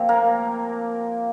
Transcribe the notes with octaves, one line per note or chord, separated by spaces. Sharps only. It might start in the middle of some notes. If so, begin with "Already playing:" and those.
Already playing: A#2 F3 C4 G4
A#3 A#4